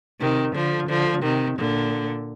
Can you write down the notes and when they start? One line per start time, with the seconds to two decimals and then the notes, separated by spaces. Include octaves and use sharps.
0.20 C3 D#3
0.55 D3 F3
0.89 D3 F3
1.23 C3 D#3
1.58 A#2 D3